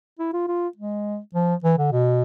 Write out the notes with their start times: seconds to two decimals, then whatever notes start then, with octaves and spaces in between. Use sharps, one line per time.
0.19 E4
0.33 F4
0.48 F4
0.78 G#3
1.35 F3
1.64 E3
1.78 D3
1.92 B2